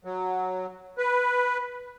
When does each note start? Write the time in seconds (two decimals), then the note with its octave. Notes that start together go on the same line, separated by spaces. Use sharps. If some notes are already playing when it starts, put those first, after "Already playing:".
0.05 F#3
0.98 B4